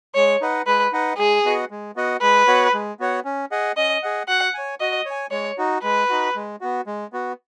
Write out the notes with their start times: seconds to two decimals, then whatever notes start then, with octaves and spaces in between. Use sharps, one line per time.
0.15 G#3 C#5
0.41 D#4 B4 D#5 F#5
0.67 G#3 B4
0.92 D#4 B4 D#5 F#5
1.18 G#3 G#4
1.44 B3 F#4 D#5 F#5
1.71 G#3
1.96 B3 F#4 D#5 F#5
2.22 G#3 B4
2.47 B3 F#4 C#5 F#5
2.73 G#3
3.00 B3 F#4 C#5 F#5
3.25 C#4
3.51 G#4 D#5 F#5
3.77 C#4 D#5
4.03 G#4 D#5 F#5
4.28 F#4 F#5
4.54 C#5 G#5
4.80 F#4 D#5
5.05 C#5
5.11 G#5
5.31 G#3 C#5
5.58 D#4 F#4
5.83 G#3 B4
6.09 D#4 F#4
6.35 G#3
6.61 B3 F#4
6.87 G#3
7.13 B3 F#4